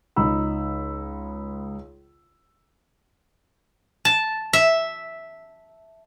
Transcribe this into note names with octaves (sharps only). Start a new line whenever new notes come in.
C#2 D#4 B5 E6
A5
E5